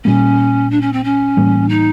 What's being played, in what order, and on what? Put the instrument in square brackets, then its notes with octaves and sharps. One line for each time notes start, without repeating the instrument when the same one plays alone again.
[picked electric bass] A#2 G3 A#3 [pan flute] C#4
[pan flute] D4
C#4
C4
C#4
[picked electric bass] A2 E3 G3 A#3
[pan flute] D#4